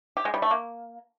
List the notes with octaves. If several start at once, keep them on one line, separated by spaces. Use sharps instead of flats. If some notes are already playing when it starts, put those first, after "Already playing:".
G4
G#3
G3
A3
A#3